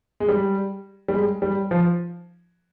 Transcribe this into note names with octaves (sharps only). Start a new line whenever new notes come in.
G#3
G3
G3
G#3
G3
F3